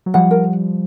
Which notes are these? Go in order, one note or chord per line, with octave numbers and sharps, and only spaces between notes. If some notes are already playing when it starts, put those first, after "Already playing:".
F#3
F3 G3 F#5
A#4